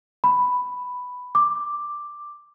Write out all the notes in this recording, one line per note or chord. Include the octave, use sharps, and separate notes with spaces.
B5
D6